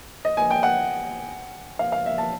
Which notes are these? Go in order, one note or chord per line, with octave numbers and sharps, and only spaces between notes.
D#5
G#5
G5
F#5
F5
F5
E5
A5